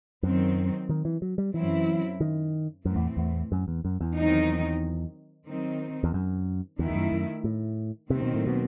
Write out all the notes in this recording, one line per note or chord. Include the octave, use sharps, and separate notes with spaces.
F#2 D#3 F#3 C4
D#3
E3
F#3
G3
F#2 E3 F#3 C4 E4
D#3
F#2 A2 E3 A3 C4
E2
E2
F#2
E2
F#2
E2
D#3 F#3 C4 D#4
D#3 F#3 C4 D#4
E2
F#2
E2 D#3 A3 E4
E2
F#2
F#2
A2
D#2 C3 D#3 F#3 C4
B2
A2
B2